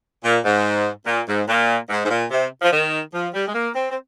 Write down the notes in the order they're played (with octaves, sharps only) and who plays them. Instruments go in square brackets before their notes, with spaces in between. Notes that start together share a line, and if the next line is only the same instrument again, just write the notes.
[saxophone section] A#2
G#2
A#2
G#2
A#2
G#2
G#2
A#2
C3
F3
D#3
F3
G3
G#3
A#3
C4
C4